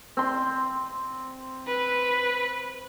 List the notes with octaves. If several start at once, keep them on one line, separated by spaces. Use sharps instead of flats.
C4 C6
B4